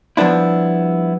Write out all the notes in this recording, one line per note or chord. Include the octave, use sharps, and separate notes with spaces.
F3 G3 B3 D4 E4